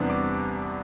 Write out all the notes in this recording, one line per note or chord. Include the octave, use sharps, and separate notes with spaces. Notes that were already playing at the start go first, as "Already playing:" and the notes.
Already playing: E2 C3 G3 B3 D4
D6